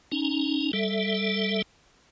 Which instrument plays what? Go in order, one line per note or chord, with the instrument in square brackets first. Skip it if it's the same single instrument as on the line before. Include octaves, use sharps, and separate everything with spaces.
[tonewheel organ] C#4 D#4
G3 A4 E5